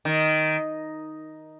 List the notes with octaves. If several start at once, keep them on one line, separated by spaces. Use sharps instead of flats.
D#3